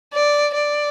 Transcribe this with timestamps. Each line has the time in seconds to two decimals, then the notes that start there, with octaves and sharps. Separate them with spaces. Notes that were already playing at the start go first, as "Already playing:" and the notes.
0.14 D5
0.55 D5